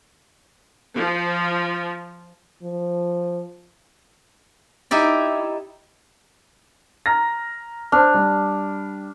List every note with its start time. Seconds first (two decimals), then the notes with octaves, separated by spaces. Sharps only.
0.98 F3
2.63 F3
4.91 D#4 E4 G4 D5
7.06 A#5 F6 A#6
7.92 D4 C5 F6
8.14 G3